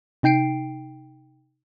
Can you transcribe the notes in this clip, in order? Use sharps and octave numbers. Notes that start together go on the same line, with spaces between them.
C3 D#4 G5 C7 D7